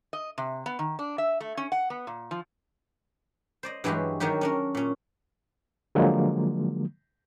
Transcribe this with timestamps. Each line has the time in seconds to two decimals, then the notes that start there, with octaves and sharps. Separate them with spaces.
0.13 D#5
0.38 C3
0.66 B3
0.79 D#3
0.99 D4
1.18 E5
1.41 A3
1.57 C#4
1.72 F#5
1.90 B3
2.07 A#2
2.31 F3
3.63 C5 D5 D#5
3.84 G2 E3 F#3 G#3 F#4 G4
4.20 D#3 F#3 D#4 F#4 G4
4.41 C#4 D4 A#4
4.75 A#2 C#4
5.95 D3 F3 F#3 G#3 A#3